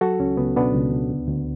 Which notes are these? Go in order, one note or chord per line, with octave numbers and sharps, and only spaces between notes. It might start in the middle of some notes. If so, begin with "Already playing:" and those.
F#3 F#4 A4
C#2 C#4
C#2 B3
B2 B3 D4
C#2
C#2
D2
D2